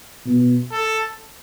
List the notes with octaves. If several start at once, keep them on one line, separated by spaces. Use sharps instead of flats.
B2
A4